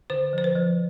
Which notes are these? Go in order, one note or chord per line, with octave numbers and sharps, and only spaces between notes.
D3 C5
F3 C5
B4
F3